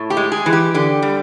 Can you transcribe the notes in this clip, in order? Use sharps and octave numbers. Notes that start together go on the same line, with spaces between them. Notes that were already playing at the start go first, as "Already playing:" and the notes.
Already playing: A2
G4
G#3
G#4
E3
G4
D3 G4
G3